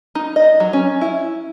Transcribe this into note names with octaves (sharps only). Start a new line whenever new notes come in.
D#4
D#5
F#3
C#4
E4